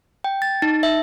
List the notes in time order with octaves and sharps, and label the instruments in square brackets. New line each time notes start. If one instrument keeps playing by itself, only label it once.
[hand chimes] G5
A6
D#4
E5